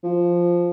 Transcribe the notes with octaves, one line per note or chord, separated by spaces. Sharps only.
F3